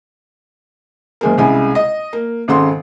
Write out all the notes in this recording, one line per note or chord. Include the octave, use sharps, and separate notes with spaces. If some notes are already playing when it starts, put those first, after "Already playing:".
F#1 G#3 A#3
C2 C#3 G#3 E4 G#5
D#5
A#3
G#1 C#3 A4 F#5 C6